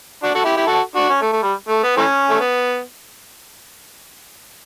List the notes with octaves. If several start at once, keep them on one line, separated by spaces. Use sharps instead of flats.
D4 F#4
F#4 A4
E4 G4
E4 G4
F#4 A4
D4 F#4
C#4
A3
A3
G3
A3
B3
E3 A3 C#4
A3
B3